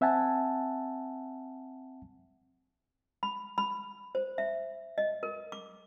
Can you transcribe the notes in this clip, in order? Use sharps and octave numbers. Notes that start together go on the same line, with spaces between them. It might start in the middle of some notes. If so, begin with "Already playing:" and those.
C4 E5 F#5 G#5 A5
B5
B5
C5
E5
D#5
A#4
D6